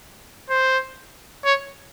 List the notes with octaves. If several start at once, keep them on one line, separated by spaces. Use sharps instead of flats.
C5
C#5